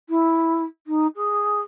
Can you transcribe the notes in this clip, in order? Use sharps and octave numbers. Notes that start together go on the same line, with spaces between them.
E4
D#4
G#4